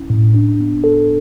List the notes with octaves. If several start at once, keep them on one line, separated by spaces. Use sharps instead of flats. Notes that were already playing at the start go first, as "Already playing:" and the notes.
Already playing: C#4 E4
A2
D4
B3
A4